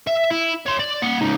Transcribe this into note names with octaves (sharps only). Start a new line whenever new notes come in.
E5
E4
C#5 C6
D5
A#3 F#5
C#2 D#4